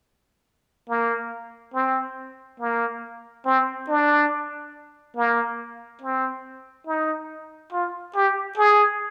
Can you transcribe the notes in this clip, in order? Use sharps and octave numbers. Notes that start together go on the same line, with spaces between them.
A#3
C4
A#3
C4
D4
A#3
C4
D#4
F4
G4
G#4